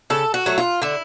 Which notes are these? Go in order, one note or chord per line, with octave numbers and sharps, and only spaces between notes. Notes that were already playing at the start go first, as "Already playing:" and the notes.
C#3 A4
F#4
F#3 A3
F4
D3 E4